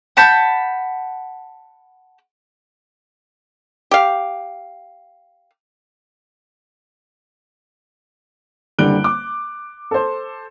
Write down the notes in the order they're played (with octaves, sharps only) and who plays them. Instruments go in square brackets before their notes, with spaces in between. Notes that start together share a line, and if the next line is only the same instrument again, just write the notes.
[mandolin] F#5 A5 B5 G6
[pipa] G4 F5
[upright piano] F#1 D3 G3 F#6 D7 G7
D6
A4 C5